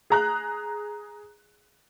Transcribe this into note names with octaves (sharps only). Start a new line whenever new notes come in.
G#4 A#5 F#6